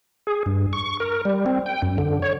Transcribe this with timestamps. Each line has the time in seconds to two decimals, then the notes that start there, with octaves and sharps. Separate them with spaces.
0.27 G#4
0.46 G2
0.73 C#6
1.00 A#4
1.25 G3
1.46 C4
1.66 G5
1.82 F#2
1.98 D3
2.22 C#5